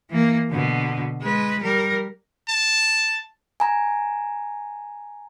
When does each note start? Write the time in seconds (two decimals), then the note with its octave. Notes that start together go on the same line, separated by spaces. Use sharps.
0.10 E3 A#3
0.50 B2 D3
1.22 G#3 B4
1.63 G3 A#4
2.49 A5
3.60 G#5 A#5